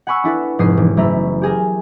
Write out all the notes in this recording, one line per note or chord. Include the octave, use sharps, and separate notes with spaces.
F#5 G#5 B5 C#6 E6
D4 E4 A4 B4
F1 G#2 G#4 D#6 C7
E1
F#1 A3 E5 A#5 B5
G4 G#4 A#4